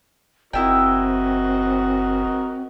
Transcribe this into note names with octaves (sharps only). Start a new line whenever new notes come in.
F#1 C4 E4 F#4 A#4 D#5 E5 G5